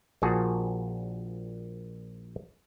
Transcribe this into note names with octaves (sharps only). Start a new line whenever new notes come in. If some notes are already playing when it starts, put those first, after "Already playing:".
A#1 A#2 F3 F#4 G#4 A5